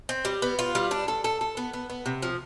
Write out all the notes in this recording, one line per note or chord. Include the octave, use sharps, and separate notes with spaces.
C4
G3
B3
F4
G3
D4
A4
A4
A4
B3
B3
B3
C3
F3